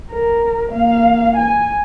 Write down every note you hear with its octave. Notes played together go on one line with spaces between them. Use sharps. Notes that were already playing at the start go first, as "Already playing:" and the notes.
A#4
A#3 F5
G#5